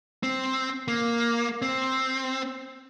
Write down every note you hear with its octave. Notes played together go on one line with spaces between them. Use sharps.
C4
A#3
C4